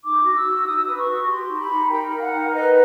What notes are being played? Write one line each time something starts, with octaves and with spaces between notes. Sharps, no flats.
D#4 D6
F#4
E6
F#4
D#4 D#6
E6
B4 D#6
C#6
F#4
G4 C6
D#4
B5
D#4
A#4 G5
A#4
F5
F#5
D#4
B4 D#5